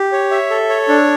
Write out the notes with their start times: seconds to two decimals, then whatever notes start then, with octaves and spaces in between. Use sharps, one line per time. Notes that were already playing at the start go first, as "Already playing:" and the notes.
Already playing: G4
0.12 C#5
0.31 E5
0.50 A4
0.69 C#5
0.88 D4